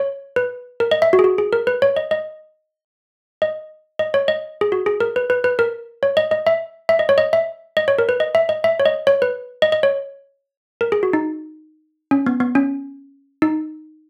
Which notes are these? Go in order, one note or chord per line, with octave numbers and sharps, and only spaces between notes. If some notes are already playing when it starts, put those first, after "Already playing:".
Already playing: C#5
B4
A#4
D#5
E5
F#4
G#4
F#4
G#4
A#4
B4
C#5
D#5
D#5
D#5
D#5
C#5
D#5
G#4
F#4
G#4
A#4
B4
B4
B4
A#4
C#5
D#5
D#5
E5
E5
D#5
C#5
D#5
E5
D#5
C#5
A#4
B4
D#5
E5
D#5
E5
C#5
D#5
C#5
B4
D#5
D#5
C#5
A#4
G#4
F#4
D#4
C#4
B3
B3
C#4
D#4